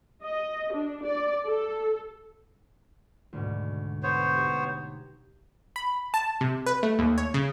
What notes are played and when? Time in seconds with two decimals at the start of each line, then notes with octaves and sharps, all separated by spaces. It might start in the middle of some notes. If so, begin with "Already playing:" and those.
0.23 D#5
0.73 D4
1.04 D5
1.47 A4
3.33 D2 G#2 B2
4.03 B3 C5 C#5
4.35 D#4 G4
5.76 B5
6.14 A5
6.41 C3
6.66 B4
6.83 A3
6.99 D#2
7.18 C#5
7.34 C#3